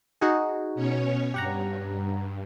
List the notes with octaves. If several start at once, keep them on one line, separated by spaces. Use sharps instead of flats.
D#4 F#4 G#4
B2 C#4 C#5
G2 G4 F#5 A#5